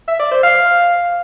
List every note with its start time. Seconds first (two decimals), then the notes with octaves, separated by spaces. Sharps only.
0.08 E5
0.20 D5
0.31 C5
0.43 F5